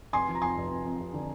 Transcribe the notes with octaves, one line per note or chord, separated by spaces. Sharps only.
F1 G#5 C6
F3
A#5
F2 G#5 C6
F1
F2
F2
F1
D3